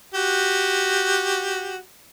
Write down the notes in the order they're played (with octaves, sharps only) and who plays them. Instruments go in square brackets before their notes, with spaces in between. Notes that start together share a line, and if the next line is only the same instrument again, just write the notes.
[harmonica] F#4 G4